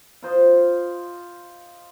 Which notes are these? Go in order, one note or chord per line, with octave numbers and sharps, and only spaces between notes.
F4 C5 D#5